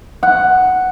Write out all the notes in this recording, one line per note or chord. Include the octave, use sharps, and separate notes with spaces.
F#5